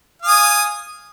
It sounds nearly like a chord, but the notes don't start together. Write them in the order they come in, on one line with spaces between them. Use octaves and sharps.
F5 D#6 G#5